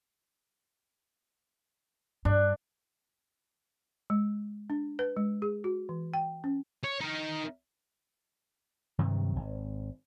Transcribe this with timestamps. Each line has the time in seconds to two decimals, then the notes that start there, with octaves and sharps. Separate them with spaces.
2.25 G2 D4
4.10 G#3
4.70 D4
4.99 B4
5.17 G#3
5.42 G#4
5.64 F#4
5.89 E3
6.14 G5
6.44 C#4
6.84 C#5
7.01 D#4 A#4
8.99 G2 C3 D#3 F#3
9.36 G#1